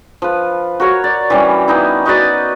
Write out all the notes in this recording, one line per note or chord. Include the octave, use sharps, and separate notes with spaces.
F3 B4
F#4 A#4 C#5
D5
E3 G3 C#4
B3 D#4 E4
D#4 F#4 B4 D5